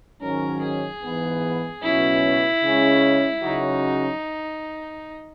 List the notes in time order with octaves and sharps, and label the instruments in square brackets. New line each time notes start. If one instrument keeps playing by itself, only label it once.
[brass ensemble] G#2 D#3 F#3 C#4 [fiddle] A#4
[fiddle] G#4
[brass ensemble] G#2 E3 B3
[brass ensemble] C#2 B2 F#3 C#4 [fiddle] E4
[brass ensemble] C#3 G#3 C#4 G#4
[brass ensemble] C#2 C#3 F#3 C#4 F#4 [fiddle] D#4